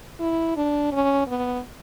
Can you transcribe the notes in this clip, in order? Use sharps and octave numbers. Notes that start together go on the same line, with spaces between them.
E4
D4
C#4
B3